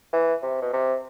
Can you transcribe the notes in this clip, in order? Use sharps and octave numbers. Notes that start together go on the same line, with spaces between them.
E3
C3
B2
C3